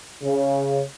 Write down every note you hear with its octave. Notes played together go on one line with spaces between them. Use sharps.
C#3